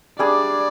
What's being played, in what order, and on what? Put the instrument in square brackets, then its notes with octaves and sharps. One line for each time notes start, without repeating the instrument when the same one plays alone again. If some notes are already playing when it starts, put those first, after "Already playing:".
[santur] G3 D4 G#4 [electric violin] D5